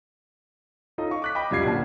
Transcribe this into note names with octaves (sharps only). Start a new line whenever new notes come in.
C#4 D#4 F4 A4 D#5
F5 C#6
D6 F#6 B6
D#5 G5 B5 D6
C#2 F#2 G3 F4 G#6 C7
D1 A#2 D4 A5